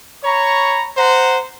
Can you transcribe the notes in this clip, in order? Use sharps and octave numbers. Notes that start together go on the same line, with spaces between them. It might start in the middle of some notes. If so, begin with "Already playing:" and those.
C#5 A#5 B5 C#6
C5 F#5 A#5